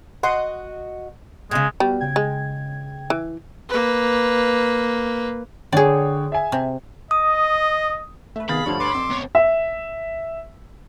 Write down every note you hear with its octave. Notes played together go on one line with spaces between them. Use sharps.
F#4 D#5 F#5 C6
A2 C#3 G#3
G3 B3 F#4
C#3 G5 G#6
G#3
E3
A#3 B4
D3 G#4 C#5 D5 G5
E5 G#5
C3
D#5 D#6
A3 B4 E5
C3 D#3 B3 G#4 F5 B5 A6
D2 G2 F3 C#5 F5
B4 C#5 A5 C6 D6
F2 E6
D2 B3 C#5
E5